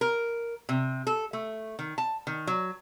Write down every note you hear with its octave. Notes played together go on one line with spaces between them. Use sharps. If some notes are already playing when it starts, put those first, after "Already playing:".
A#4
C3
A4
A3
D#3
A5
D#3
F#3